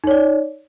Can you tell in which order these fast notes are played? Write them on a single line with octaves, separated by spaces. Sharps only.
D#4 C#5 D5